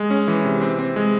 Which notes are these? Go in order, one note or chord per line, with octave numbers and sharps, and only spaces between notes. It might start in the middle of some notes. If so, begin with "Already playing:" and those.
Already playing: G#3
C#4
E3
C3
C4
C4
G#3